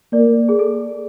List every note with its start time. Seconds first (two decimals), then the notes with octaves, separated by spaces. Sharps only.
0.13 A#3 D5
0.49 G#4
0.59 A4